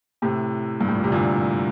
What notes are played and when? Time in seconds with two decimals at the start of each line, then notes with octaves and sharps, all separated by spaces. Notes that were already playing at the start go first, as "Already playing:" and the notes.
0.22 A2 C3
0.81 G2
0.88 A2
0.97 A#2
1.04 C3
1.12 A#2 D3